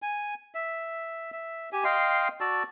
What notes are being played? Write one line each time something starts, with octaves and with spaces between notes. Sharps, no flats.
G#5
E5
E5
G4 G#5
D#5 F5 G5 C6
F#4 D5 A5 E6